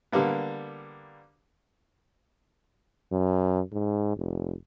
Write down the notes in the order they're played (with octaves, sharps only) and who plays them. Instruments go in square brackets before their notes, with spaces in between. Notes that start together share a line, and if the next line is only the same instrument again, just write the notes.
[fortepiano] D3 G3 A#3 B3
[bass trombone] F#2
G#2
F1